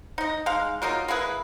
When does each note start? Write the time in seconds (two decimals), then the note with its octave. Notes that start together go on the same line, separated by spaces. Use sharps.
0.18 D#4 D#5
0.46 G#3 D#4 F5
0.82 F#3 A#3 D#4 F4
1.08 A#3 E4 G#4 B4